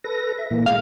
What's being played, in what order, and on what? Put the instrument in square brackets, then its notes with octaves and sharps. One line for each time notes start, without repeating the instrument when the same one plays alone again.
[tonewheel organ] A4 B4 A#6
E5
A#2 E3 A#3
[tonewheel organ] G#3 [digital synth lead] F5